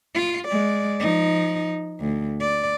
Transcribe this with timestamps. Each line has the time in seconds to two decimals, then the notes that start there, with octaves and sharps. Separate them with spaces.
0.15 F4
0.48 G#3 D5
1.00 F3 D#4
2.00 D2
2.41 D5